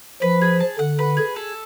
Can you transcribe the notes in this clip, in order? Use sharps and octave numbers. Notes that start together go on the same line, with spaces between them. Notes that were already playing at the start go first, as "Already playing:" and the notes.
F3 B4
G#4
A5
D3 F#5
B4
G#4
A4